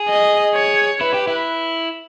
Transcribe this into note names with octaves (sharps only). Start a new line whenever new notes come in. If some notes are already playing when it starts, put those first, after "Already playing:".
Already playing: G#4
D#5
C#5
E4 B4
G4
E4